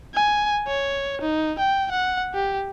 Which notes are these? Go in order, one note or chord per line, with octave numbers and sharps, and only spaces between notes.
G#5
C#5
D#4
G5
F#5
G4